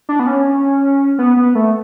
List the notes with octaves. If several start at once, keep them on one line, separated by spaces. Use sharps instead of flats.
D4
B3
C#4
B3
B3
A3